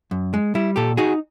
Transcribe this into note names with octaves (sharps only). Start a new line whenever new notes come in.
F#2
G#3
G3 E4
A#2 G4 A4
D#4 F#4 G#4